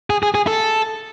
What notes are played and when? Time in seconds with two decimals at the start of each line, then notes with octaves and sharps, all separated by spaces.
0.10 G#4
0.23 G#4
0.35 G#4
0.47 A4